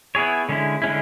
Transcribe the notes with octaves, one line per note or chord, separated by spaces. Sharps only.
B3 E4 G#4 C#5
D3 G#3 C#4 E4
D3 G#3 C#4 E4